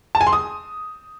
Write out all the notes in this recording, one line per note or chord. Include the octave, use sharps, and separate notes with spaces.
A5
G#5
C6
D#6